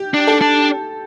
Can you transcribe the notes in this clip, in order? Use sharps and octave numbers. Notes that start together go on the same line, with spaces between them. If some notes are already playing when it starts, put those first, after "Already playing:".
Already playing: G4
D4
A4
D4